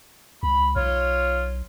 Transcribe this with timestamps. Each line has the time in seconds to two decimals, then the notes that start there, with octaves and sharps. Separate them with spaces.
0.43 C#2 B5
0.76 B1 F4 C#5